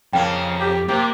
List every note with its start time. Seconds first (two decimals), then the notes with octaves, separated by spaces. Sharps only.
0.13 F2 C#3 A#3 G5
0.61 G4
0.89 C3 A#3 G4